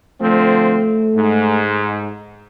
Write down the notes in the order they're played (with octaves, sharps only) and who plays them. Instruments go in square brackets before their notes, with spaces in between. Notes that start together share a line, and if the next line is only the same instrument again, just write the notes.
[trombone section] D3 F3 C4 [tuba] A3
[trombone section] G#2